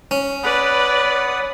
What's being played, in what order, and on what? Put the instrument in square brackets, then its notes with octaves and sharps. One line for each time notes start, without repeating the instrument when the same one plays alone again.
[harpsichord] C#4
[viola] B4 D5 [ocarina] C#5 [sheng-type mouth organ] F#5 B5 D#6